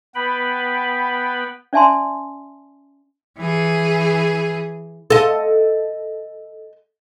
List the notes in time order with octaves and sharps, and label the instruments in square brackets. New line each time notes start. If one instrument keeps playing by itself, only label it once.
[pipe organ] B3 B4 G5 B5
[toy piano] C#4 D5 E5 G#5 A5 C6
[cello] E3 G#4
[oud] A4 D#5